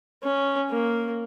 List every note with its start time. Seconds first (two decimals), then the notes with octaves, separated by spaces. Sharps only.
0.23 C#4
0.70 A#3